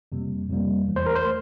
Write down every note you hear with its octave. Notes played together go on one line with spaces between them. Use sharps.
F2 C3 G3 A#3
F2 C3 G3 A#3
E2 E3 A3
C5
A#4
C5
E3 A3